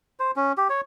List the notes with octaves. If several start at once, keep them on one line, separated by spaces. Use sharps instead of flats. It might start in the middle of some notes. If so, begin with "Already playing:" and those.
C5
C#4
G4
C#5